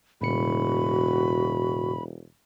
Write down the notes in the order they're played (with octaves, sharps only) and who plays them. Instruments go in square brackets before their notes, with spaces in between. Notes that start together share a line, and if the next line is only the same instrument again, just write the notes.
[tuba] E1 [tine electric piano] A2 C#3 C#7 [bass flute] F#4 [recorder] B5